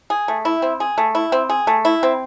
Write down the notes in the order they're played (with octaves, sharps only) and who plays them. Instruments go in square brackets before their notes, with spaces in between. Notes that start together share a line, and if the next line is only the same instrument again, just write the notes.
[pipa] G#4
A3
E4
C4
G#4
A3
E4
C4
G#4
A3
E4
C4